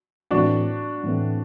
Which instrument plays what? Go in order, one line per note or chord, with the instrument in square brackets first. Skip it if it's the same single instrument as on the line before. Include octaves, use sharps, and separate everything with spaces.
[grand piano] A2 E3 A3 C4 [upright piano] D4 F#4
[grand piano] A2 E3 A3 C4